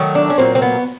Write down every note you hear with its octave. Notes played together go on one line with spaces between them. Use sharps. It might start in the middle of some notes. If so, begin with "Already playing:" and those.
Already playing: D#3 F#3 A3
D4
C#4
A#2 F#3 A#3 C4
C4
B3